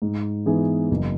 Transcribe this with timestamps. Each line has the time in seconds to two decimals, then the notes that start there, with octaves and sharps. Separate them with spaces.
0.02 G#2
0.46 E3 B3 D#4 G#4
0.91 F#1